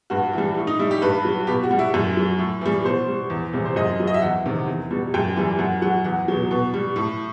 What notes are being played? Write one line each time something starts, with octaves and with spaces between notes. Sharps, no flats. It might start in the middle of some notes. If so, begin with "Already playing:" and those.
G2 F#4
E3 G3
A2
D#4
G3 E4
G4
G2 B4
F#3
B2 G4
F#4
G3
E4
F#2
F#3
A2
E3 G3
B2 C5
G3
E2
C3 E3 G3
C5
F#2 D#5
F#3
D#5
E5
E2 F#5
C3 D#3
E2
B2 G3
F#2 G5
E3 G3
F#2 F#5
F#3 F#5
E2 F#5
B2 F#3
B2
G3
A2